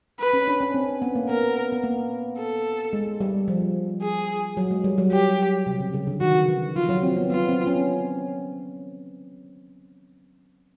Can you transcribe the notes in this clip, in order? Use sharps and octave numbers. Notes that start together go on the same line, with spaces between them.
B4
C#4
D4
C#4
C4
B3
A#3
B3 A#4
B3
A#3
A4
G#3
G3
F3
G#4
F#3
G#3
G3
F#3
G4
C3
C#3
C#3
D3
D#3 F#4
E3
F3 F4
F#3
C4
B3
B3 F4
C4
C#4